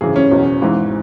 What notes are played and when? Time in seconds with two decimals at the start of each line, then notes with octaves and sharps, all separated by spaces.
0.01 G#1 F#2 C#3 E3 G#4
0.16 C#4
0.31 F#1 E2 B2
0.61 G#1 G#2 E3